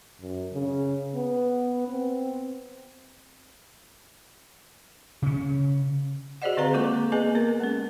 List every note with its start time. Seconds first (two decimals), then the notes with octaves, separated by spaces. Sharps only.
0.20 F#2
0.53 C#3
1.15 B3
1.88 C4
5.22 C#3 C#4
6.42 F#4 G#4 C5 D5 D#5 F#5
6.57 D3 C4 G#4 B4 F5 A#5
6.73 G#3 A#3 F4 A4 C#6 D6
7.12 A#3 B3 G#4 B4 D#5 G#5
7.35 B3 A#4
7.60 G#3 C#4